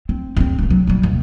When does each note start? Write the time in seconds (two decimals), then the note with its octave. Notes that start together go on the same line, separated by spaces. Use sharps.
0.09 C4
0.37 E2 C4
0.59 D1 C3
0.70 F#3
0.87 A#2 G3
1.03 D#2 C3